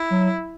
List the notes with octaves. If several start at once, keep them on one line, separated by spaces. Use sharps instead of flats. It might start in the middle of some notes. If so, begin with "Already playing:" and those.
Already playing: E4
F#3